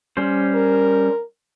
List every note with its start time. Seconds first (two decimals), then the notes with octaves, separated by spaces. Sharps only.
0.17 G3 C#4 C5
0.54 A#4